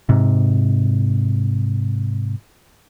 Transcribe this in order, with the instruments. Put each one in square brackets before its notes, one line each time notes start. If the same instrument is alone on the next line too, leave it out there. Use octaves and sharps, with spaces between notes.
[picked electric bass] G#2 C3